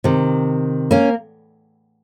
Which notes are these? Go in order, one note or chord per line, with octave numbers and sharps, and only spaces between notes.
C3 D#3
A#3 C#4